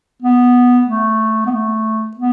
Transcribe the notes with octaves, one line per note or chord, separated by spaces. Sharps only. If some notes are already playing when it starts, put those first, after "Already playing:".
B3
A3
B3
A3
B3